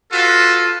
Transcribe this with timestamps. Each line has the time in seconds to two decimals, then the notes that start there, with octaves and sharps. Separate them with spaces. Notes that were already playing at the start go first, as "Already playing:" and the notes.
0.12 F4 F#4 A4 B4